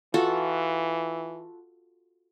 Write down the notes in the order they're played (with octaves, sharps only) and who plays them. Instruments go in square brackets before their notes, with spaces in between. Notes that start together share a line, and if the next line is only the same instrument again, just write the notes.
[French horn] E3 [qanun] F4 F#4 A4